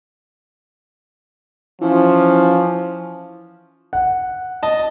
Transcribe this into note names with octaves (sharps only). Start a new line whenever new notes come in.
E3 F3 C#4
F#5
D#5 A5